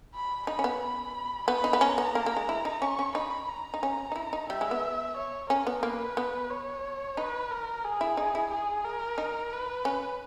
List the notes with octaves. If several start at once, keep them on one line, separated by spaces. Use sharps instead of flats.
B5
D#4 B5
C#4
B3
B5
B3 B5
D#4
B3
C#4 A#5
B3
A#3
A#3
G#3
E4
D#4
C#4 C#6
C#4
D#4 B5
A#5
D#4
C#4
D#4
E4
D#4
G3 E5
G#3
B3
C#5
C#4 A#4
B3
A#3 B4
B3
C#5
D#4 B4
A#4
G#4
E4
D#4
E4
G#4
A#4
D#4
B4
C#4